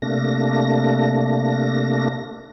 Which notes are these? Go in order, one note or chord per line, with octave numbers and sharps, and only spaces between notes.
C3 A3 A#3 D4 A#6